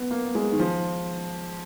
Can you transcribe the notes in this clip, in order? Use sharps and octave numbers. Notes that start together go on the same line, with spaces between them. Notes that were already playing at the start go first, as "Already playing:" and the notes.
Already playing: B3
A#3
G#3
D#3
F3